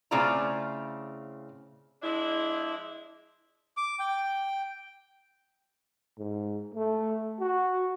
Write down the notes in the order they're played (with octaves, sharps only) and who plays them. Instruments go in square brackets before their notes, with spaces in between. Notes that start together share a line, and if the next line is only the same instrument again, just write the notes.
[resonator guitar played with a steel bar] A2 C#3 C4 F4 D5 A#5
[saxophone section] F3 G#3 D4 E4
[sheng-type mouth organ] D6
G5
[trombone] G#2
A3
F#4